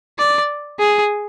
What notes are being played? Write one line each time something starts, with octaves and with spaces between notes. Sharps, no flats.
D5
G#4